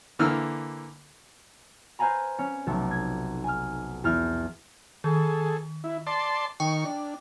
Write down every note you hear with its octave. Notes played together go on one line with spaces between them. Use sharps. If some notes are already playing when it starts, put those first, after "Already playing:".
D3 E3 A#3 E6 F6
B4 C5 F5 G#5 A#5 B5
C#4
F1 B1 A3
G#6
G#5 F6
E2 E4 F6
D#3 G#4 A4
E4
D5 A5 C6
D#3 G5 C#6
D4